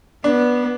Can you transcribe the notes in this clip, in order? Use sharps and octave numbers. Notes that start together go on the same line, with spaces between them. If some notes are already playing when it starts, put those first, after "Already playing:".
B3 D4